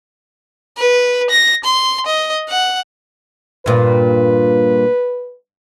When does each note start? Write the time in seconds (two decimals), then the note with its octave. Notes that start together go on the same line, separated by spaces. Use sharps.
0.77 B4
1.30 A#6
1.64 C6
2.07 D#5
2.49 F#5
3.66 G2 A#2 B4